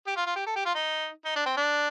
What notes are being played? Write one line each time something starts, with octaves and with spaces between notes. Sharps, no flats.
G4
F4
F4
G4
A4
G4
F4
D#4
D#4
D4
C4
D4